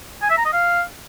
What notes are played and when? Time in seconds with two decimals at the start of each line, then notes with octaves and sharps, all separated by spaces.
0.22 G#5
0.30 E5
0.38 A#5
0.45 D#5
0.53 F5